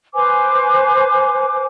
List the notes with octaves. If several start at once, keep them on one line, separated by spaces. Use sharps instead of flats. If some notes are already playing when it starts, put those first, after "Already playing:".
B4 C5 G#5 D6